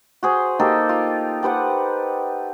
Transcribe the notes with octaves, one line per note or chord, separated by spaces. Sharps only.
F#4 G#4 C5
A#3 D#4 G4 A4
F4
G4 B4 C5 F#5